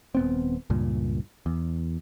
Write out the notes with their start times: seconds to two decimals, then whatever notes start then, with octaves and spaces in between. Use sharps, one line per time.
0.15 D#1 B3 C4
0.70 C#2 G2 A#2
1.46 E2